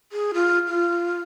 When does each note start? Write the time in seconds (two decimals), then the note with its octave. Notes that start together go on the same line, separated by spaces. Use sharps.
0.12 G#4
0.34 F4
0.67 F4